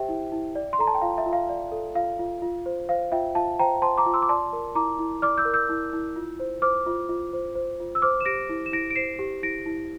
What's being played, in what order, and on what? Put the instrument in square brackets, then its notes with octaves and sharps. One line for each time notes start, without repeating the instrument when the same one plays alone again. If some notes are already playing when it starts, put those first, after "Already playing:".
Already playing: [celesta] G4 C5 E5 G5
E4
E4
D5
C6
A4 A#5
A5
G5
F4 F5
E5
F4
F5
D5
A4
F4 F5
F4
F4
C5
C5 F5
F4 E5 G5
F4 F5 A5
C5 G5 A#5
C5 A5 C6
A#5 D6
F4
C6 E6
D6
D5 A5 C6
A#4
E4 A#5 D6
E4
D5 D6 F6
E6 G6
A#4
E6 G6
E4
E4
F4
C5
C5 D6 F6
F4
F4
C5
C5
F4
E6
C5 D6 F6
E7
G4 A#6 D7
E4
E7
E4 A#6 D7
D7
C5 C7 E7
G4
E4 A#6 D7
E4